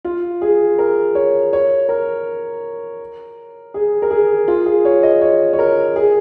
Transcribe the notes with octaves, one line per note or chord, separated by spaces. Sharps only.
F4
G#4
A#4
C#5
C#5
A#4
G#4
A#4
G#4
F4
G#4
C#5
D#5
C#5
C#5
A#4
G#4